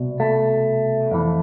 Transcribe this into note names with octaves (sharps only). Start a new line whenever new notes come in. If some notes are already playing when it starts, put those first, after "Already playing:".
Already playing: C2 B2
A3
F2 E3